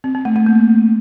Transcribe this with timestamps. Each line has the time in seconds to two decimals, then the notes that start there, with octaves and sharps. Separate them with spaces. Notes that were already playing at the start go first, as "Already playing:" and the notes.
0.04 C4
0.15 C4
0.25 A3
0.36 A3
0.46 A#3